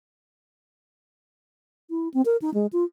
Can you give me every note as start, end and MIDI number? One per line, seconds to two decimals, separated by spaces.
1.90 2.08 64
2.14 2.21 60
2.25 2.37 70
2.42 2.53 63
2.54 2.66 56
2.72 2.84 65